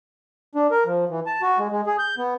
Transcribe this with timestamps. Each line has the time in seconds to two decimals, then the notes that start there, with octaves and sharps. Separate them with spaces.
0.55 D4
0.71 A#4
0.85 F3
1.09 E3
1.26 A5
1.42 F#4
1.59 G#3
1.71 G#3
1.86 G#4
1.99 G6
2.18 B3